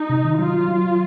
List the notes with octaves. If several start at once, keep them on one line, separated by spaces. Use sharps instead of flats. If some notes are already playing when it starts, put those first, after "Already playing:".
Already playing: D#4
C3
D#3
F#3 F4
F#3
F#3
F#3